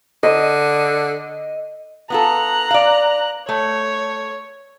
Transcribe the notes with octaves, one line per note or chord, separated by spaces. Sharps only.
D3 D#5
B3 F4 A4 A#5 F#6
D5 F5
A3 C#5